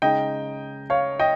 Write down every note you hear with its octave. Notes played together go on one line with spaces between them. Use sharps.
C#3 G#3 D#4 D#5 G5
C#5 F5
D#5 G5